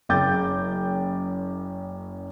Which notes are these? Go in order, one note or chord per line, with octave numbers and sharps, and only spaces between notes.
F#1 F#2 G5 D6 G6 A6